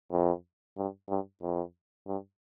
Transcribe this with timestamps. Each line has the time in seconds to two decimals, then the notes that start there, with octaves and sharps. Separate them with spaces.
0.12 F2
0.77 G2
1.09 G2
1.42 F2
2.07 G2